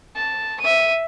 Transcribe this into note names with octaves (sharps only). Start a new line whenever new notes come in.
A5
E5 D#7